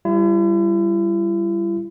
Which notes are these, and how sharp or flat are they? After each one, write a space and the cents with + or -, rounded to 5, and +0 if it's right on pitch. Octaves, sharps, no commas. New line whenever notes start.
G3 +0 E4 +40